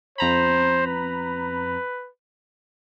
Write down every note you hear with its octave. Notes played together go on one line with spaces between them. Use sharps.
F2 C5 A#5 B5
B4